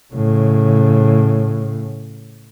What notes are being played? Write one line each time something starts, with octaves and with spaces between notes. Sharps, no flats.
A2 C#3